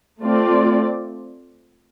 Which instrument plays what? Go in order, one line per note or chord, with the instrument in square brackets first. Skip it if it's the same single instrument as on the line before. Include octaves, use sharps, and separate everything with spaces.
[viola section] A3 C4 F4 D5